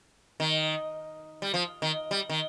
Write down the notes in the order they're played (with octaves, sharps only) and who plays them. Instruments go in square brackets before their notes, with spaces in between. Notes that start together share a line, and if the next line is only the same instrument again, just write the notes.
[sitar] D#3
G3
F3
D#3
G3
D#3